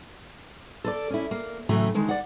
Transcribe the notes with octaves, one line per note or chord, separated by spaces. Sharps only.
A4 B4 D5
C#4 E4
A#3
A2 C#3 E3 F#3 A3
D3 D#3 G#3
D5 F#5